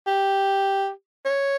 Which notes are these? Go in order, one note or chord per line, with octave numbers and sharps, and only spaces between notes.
G4
C#5